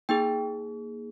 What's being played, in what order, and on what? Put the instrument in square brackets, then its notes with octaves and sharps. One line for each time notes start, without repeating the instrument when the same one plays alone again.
[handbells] A#3 D#4 G#4 G5